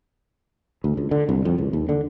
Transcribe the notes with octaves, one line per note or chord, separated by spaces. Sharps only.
D2
C#2
D3
C2
F2
C#2
D#2
D3